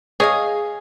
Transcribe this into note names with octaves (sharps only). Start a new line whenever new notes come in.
G#4 C#5 D#5 F5